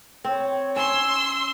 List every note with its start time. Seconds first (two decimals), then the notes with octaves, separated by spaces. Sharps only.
0.24 C4 C#5
0.76 C#4 C6 E6